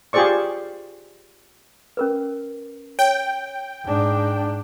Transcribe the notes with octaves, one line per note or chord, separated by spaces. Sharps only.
F4 G4 G#4 C5 D5 C#6
C#4 A#4 B4
C#5 G5
G#2 D4